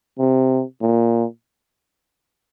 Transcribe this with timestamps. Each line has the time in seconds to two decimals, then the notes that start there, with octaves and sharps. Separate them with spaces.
0.19 C3
0.81 A#2